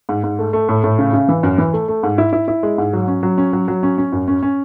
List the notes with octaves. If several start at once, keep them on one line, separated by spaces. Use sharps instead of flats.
G#2
G#2
A3
A3
A2
A2
C#3
C#3
E3
F#2
E3
A3
A3
G#2
E4
E4
E4
G#3
G#2
F#3
C#4
F#3
C#4
F#3
F#3
C#4
C#4
F#2
C#4
C#4